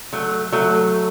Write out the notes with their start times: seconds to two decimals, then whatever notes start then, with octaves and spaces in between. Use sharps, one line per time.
0.13 F#3 A3
0.52 F#3 A3